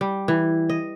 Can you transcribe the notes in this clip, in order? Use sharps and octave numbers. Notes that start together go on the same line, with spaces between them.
G3
E3
D#5